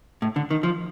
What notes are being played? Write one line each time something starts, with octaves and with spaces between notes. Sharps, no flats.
A2
D3
D#3
F3